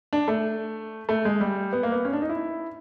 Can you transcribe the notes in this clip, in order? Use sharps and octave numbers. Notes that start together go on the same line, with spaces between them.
D4
A3
A3
G#3
G3
B3
A#3
B3
C#4
D4
D#4
E4